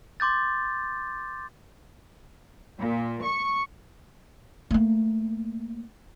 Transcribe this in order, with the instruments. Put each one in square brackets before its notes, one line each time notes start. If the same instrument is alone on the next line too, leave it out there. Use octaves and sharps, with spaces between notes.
[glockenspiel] C6 D6 G6 A6
[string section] A#2
C#6
[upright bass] A3 A#3